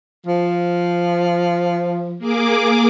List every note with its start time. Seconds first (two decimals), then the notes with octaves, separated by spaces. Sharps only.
0.24 F3
2.18 A#3 G#4 D6